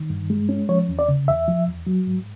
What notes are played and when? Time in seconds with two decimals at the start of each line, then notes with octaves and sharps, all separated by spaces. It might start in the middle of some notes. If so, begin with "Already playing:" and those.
Already playing: D#3
0.10 G2
0.30 G#3
0.49 C#4
0.69 F3 C#5
0.89 E2
0.99 D5
1.08 C#3
1.28 E2 E5
1.48 F3
1.67 E2
1.87 F#3
2.07 G#2